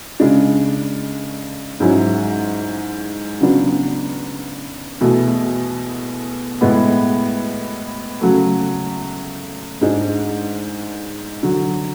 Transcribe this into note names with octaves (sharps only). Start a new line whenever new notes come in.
C#3 G#3 D4
G#2 F#3 C#4 E4
C#3 F#3 B3 D4
E2 B2 A3 E4
A2 G#3 B3
C#3 F#3 A3
G#2 G#3 D4
D3 F#3